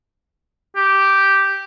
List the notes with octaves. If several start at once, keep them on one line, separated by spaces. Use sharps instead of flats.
G4